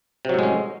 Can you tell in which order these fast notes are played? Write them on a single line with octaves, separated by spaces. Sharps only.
C3 F#3 A2 G#3 C#4